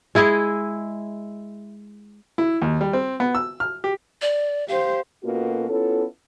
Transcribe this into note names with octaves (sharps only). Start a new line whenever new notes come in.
G#3 E4 G#4 D#5
E4
D#2
G3
C4
B3
E6
F6
G4
D5
G4 C5 F5
B2 A#3 C#4 F4 F#4 A4
B3 C#4 E4 F4 A4